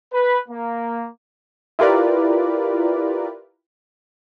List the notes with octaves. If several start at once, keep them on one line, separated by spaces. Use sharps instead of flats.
B4
A#3
E4 F4 G4 A#4 B4 D5